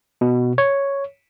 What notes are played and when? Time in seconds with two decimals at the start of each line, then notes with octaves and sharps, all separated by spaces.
0.21 B2
0.58 C#5